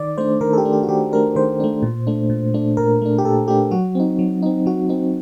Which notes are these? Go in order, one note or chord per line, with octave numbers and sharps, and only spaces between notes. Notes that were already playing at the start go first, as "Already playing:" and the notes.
Already playing: D#3 D5
A3 D4 C5
D#3 A#4
A4
G4
A3 D4
G4
F#4
D#3 G4
A3 D4 A#4
D#3 C5
A3 D4
A#2
A3 D4
A#2
A3 D4
A#2 A#4
A3 D4
G4
A#2 A4
A3 D4 G4
F#3 F#4
C4 D#4
F#3
C4 D#4
F#3 F#4
C4 D#4